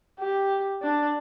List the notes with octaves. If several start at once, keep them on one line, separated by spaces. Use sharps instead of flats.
G4
D4